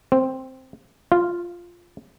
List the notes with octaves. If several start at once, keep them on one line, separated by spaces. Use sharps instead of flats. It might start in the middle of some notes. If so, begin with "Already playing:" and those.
C4
F4